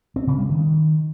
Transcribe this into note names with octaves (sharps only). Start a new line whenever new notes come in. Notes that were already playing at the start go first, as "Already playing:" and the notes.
C4
C#3
G3
D#3